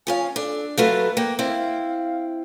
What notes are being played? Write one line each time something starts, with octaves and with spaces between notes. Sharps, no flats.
F3 C#4 F5 G#5
D4 A4
F#3 A3 F4 B4
A#3 G5
C4 E4 F5